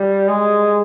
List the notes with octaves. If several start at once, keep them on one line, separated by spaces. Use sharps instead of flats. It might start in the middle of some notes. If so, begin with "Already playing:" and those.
Already playing: G3
G#3